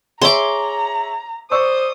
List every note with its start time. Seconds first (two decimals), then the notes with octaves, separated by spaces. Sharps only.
0.22 G#4 C#5 E5 A#5 C6 D6
1.51 C5 D5 C#6 D#6 E6